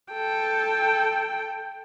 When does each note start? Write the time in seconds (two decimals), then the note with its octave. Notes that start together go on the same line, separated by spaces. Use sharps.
0.13 A4 G5